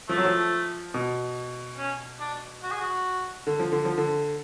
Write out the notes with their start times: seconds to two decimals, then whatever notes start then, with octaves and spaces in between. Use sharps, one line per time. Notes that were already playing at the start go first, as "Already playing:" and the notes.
0.09 F3 A3
0.18 F#3
0.25 F3
0.94 B2
1.78 C#4
2.20 D4
2.63 F#4
2.71 G#4
2.80 F#4
3.47 D3
3.59 F3
3.72 D3
3.85 F3
3.98 D3